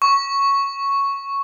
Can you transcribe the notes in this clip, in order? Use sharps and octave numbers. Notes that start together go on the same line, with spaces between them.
C#6